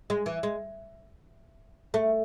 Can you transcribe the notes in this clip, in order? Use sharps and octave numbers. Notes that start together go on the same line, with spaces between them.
G#3
E3
G#3
A3